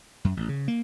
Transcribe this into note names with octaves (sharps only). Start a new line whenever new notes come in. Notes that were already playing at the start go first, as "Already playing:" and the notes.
F#2
A1
C#3
A#3